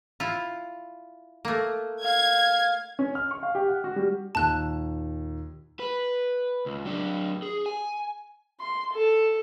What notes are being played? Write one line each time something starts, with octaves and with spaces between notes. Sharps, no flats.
E4 F4
A3 A#3
F5 G#6
C#4
F6
C#6
F5
G4
F#5
F#4
G3
D#2 A#2 D#3 A5 F#6
B4
C#2
F#3 D4
G#4
G#5
C6
A4